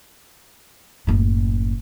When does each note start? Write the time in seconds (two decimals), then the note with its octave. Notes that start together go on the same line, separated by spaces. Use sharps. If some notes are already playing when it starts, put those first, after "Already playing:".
1.07 F#1 A2